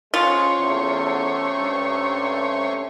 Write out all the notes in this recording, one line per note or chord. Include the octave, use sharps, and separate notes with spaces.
F2 B2 G#3 C#4 F4 C5 C#5
E2 C3 A3
G2